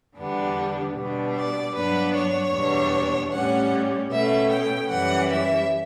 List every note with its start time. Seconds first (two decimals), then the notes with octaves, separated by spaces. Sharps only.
0.18 E2 D3 G3 B3 D4
0.96 B2 G3 D4
1.36 D5
1.75 G2 F#3 B3 D4 B4
2.15 C#5
2.54 E2 B2 G3 D4
3.33 A2 G3 C#4 F#5
4.12 B2 A3 C#4 E5
4.51 G5
4.90 F#2 E3 G3 C#4 F#5
5.30 E5